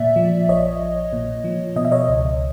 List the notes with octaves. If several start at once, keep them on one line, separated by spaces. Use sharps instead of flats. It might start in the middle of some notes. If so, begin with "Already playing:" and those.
Already playing: A#2 D5 E5
F3
A#1 C#5 D#5
A#1
A#2
F3
B2 D#5
E5
C#5 D#5
C#2